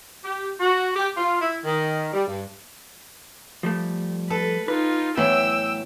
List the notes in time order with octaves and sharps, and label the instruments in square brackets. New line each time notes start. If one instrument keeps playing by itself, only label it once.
[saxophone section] G4
F#4
G4
F4
E4
D#3
G3
G2
[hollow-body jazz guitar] F3 G3 A3
[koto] A4 [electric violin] B4
[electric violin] D#4 F4 [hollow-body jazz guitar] B4
[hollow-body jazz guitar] A2 B3 E4 [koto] E3 F#3 [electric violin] G5 E6